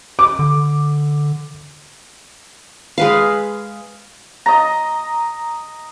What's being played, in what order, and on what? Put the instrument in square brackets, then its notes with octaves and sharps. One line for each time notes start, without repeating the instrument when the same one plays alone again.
[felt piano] D6
[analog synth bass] D3
[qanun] G#3 B4 F5
[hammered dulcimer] D#5 A#5